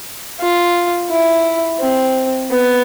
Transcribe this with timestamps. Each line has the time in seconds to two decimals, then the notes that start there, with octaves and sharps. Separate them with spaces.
0.40 F4
1.10 E4
1.80 C4
2.50 B3